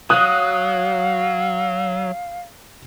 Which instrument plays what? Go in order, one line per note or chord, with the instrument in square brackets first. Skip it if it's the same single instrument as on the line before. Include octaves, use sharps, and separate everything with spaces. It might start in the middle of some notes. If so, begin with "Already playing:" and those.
[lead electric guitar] F#3 [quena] F5 [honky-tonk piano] D#6 F#6